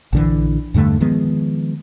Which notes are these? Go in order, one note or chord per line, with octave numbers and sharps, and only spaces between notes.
A#1 D3 E3
E2 G2 D3 A3
D#3 F3 G#3 B3